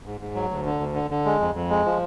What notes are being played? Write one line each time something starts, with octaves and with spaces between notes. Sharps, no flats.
G#2
G#2
F#3
D2
D3
D2
D3
D3
G#3
F2
F2
G#3
F3